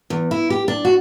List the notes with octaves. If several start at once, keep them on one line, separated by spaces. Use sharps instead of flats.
E2
E4
G4
D4
F#4